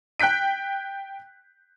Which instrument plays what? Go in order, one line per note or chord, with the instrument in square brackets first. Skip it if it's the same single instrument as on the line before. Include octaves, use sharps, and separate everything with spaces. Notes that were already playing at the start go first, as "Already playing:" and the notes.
[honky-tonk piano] G5 F#6 G6 B6 D7